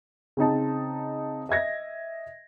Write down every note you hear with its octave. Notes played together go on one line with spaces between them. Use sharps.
C#3 C4 D#4 A5
D#5 E5 G#6 A#6